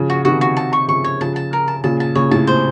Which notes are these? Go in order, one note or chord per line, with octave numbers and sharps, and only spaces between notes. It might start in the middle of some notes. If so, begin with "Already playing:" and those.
Already playing: C#3 F3
F#4
C3 D#3 F#4
F#4
A5
C#6
C#3 F3 C#6
C#5
C#3 F3 A5
A5
A#4
A5
A#2 C#3 A5
A5
A#2 C#3 C#5
A2 C3 A5
C5